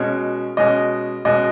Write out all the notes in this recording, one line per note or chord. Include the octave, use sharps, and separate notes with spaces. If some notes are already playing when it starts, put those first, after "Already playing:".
Already playing: B2 G#3 C#4
B2 G#3 C#4 D#5
B2 G#3 C#4 D#5